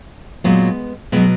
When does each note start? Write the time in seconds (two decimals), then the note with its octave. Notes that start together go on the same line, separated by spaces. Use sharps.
0.44 A#2 F#3 G#3 B3
1.12 B2 F#3 G#3 B3